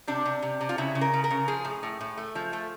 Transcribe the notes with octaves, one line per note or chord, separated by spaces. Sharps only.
C3 D4
C3
C3
C3
F4
C#3 E4
C#3
A#4
C#3
A#4
C#3
F3 G#4
A2
A2
A2
A3
F3
A3